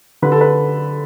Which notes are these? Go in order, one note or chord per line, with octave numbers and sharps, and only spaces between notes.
D3 B4
A4
B4